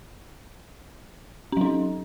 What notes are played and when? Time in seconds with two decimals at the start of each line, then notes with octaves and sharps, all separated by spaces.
1.52 C#4
1.57 F#3
1.61 D#4